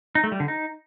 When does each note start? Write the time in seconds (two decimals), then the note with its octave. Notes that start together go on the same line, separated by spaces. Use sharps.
0.15 D#4
0.24 A3
0.32 G3
0.40 D3
0.48 D#4